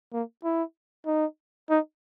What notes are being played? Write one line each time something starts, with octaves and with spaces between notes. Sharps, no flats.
A#3
E4
D#4
D#4